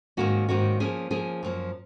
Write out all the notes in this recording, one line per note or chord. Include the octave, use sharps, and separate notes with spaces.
G#2 D#3 A#3 C#4 F#4
G#2 D#3 A#3 C#4 F#4
F3 A#3 C#4 G#4
F3 A#3 C#4 G#4
F#2 F3 A#3